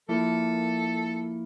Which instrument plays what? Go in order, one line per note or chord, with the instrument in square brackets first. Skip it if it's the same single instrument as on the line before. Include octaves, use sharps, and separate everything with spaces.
[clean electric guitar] F3 A#3 E4 [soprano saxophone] A4